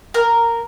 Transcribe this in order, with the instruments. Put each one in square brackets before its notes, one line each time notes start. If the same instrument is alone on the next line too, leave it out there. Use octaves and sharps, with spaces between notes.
[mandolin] A#4